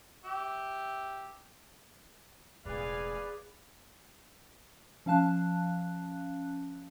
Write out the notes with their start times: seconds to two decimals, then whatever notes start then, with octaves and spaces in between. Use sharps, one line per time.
0.25 G4 E5
2.65 E1 A2 G#4 B4 D5 F5 G#5
5.06 F3 C#4 F5 A5 F#6